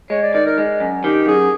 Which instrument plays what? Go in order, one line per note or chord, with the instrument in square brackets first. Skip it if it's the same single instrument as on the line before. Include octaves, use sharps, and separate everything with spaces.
[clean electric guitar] G#3 [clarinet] C#5
[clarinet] D5
[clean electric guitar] D#3 [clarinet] D5
[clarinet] A#4
[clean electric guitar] G#3
F#2
[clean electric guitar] D#3 [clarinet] G4
[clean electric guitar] F#2 [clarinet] G#4